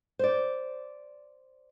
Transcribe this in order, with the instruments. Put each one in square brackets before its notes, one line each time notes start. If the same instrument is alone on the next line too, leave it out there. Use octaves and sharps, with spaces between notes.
[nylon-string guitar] C5 D5